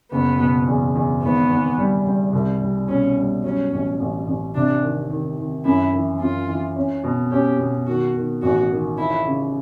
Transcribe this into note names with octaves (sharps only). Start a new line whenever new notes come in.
F#1 B3
B2
E2
E2
G#1 B3
G#1
G3
G3
C2
G3
B2 C#4
G3
F#3 C#4
A1
A1
A1
C3 D4
D#3
D#3
D#3
F#2 E4
E3
F#2 F4
E3
C#4
B2
C#4 G4
B2
D#3 F#4
D#3
A1 F#4
D#3
F3 E4
C#3